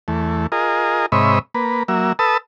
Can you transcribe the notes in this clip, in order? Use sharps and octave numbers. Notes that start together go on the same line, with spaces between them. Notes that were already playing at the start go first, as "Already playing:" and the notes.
E2 A3
F4 G#4 A#4 D#5
G#2 C3 C#5 D#5 E5 B5
A#3 B4
F#3 A#3 E5
A4 B4 A5 D#6 E6